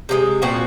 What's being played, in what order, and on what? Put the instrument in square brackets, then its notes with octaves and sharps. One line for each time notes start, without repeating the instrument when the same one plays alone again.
[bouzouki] C3 F3 G#3
A#2 F3 C4 F#4